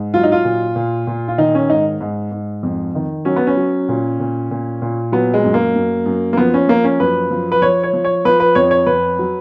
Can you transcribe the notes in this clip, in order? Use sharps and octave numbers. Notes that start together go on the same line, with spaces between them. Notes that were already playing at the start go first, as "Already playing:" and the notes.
Already playing: G#2
F#3 F4
D#4
F4
A#2
A#2
A#2
F4
D#3 D#4
C#4
G#2 D#4
G#2
G#2
F2
D#3
F#3 C#4
B3
C#4
F#3
A#2
A#2
A#2
A#2
F#3 B3
G#3
F#2
A#3
F#2
F#2
A#3
F3 B3
C#4
F3 A#3
C#4
F#2 B4
F3
B4
F3 C#5
C#5
F3
C#5
F3 B4
B4
F2 C#5
C#5
F2 B4
F#3